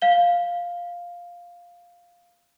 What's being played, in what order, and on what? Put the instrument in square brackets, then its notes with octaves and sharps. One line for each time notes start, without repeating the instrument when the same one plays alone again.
[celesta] F5 G7